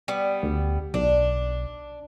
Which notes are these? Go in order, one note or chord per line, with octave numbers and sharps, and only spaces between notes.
G3 B3
D2
B1 D4